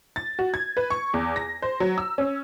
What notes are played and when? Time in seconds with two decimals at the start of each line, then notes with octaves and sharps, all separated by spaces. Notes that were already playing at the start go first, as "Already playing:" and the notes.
0.16 A6
0.39 F#4
0.54 G#6
0.77 B4
0.90 C#6
1.14 E2
1.36 A#6
1.62 C5
1.80 F#3
1.98 E6
2.18 C#4